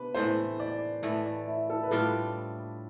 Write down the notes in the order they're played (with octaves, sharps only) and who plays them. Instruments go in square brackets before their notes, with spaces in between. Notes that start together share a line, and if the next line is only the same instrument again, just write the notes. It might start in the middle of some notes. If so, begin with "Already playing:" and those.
Already playing: [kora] C3 B3 D4 [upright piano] B4
[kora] A2 E3 A3 [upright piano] C5
[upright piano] D5
[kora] A2 E3 A3 [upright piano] E5
[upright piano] D5
E4
A4
B4
[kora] A2 G3 D4 F4 [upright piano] A4